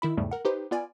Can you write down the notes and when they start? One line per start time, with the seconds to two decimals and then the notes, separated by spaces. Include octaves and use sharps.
0.02 D#3 E4 B5
0.17 E2 G#2 C#3 G3 A3
0.31 A#4 F#5
0.45 D#4 G4 B4 C5
0.71 B3 F4 D5 G#5